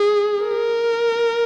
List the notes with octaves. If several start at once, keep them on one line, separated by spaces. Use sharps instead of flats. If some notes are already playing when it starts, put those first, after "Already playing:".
Already playing: G#4
A#4